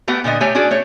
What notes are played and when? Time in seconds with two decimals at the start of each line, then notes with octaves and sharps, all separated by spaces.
0.08 A3 B3 G4 F#5
0.24 A#2 D3 B3 D#5
0.40 A3 G4 C#5 G#5
0.55 C#4 D4 F#4 G#4 D5
0.71 A3 C#5